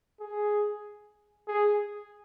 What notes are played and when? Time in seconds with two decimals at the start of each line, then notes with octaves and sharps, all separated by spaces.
0.21 G#4
1.48 G#4